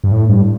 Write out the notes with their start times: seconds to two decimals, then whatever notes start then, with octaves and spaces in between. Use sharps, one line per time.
0.04 G2
0.12 A2
0.29 G2